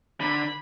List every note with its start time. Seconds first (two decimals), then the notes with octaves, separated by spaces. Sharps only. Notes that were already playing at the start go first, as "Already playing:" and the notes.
0.20 D3 B5